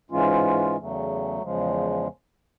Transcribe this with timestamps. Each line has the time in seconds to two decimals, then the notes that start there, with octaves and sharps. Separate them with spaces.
0.10 G#2 E3 G#3 C#4 F4
0.77 E2 C#3 F#3 A3
1.42 E2 C#3 F3 G#3